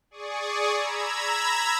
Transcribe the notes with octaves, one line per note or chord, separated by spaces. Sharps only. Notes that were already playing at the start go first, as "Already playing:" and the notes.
G#4 D5 C#6 D#6
A#5 B5 E6 G#6